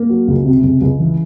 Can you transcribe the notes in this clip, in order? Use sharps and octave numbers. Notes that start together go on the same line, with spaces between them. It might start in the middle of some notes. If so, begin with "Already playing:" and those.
Already playing: A#3
F#3
C#2
C3
C#2
C#2
E3